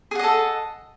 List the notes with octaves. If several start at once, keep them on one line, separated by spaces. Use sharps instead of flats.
G#4 A4 D#5 F#5